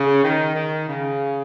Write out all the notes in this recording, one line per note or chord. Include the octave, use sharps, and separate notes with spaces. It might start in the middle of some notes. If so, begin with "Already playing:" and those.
Already playing: C#3
D#3
D#3
C#3